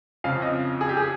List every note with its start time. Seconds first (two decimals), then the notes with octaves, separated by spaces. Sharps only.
0.24 F2 C#3 F3 F5
0.42 D#5
0.81 G#4
0.89 G4
0.97 G#4